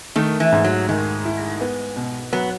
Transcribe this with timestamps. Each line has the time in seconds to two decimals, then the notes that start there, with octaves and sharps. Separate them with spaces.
0.16 D#3 A3
0.40 E3
0.52 G#2
0.65 F#3
0.89 D#3 G#3
1.25 E4
1.61 B3
1.96 B2
2.32 F#3 B3